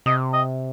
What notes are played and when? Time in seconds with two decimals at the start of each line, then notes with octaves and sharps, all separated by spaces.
0.06 C3 D#5
0.33 D#5